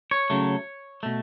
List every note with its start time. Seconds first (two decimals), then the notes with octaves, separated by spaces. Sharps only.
0.11 C#5
0.30 C#3 F#3 A3
1.03 B2 A3